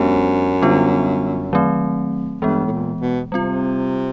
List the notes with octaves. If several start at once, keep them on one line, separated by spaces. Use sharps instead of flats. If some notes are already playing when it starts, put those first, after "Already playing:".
Already playing: F#2 G#3 B3 D4 G4 C5
D3 G3 B3 D4 F4
D#3 F#3 A3 C4
G2 E3 G#3 B3
A2
A#2
B2
C3 G3 C4 F4